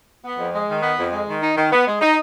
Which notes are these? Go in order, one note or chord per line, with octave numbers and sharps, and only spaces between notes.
B3
F2
G#3
D#3
B3
F2
G#3
D#3
D#4
D#3
B3
G#3
D#4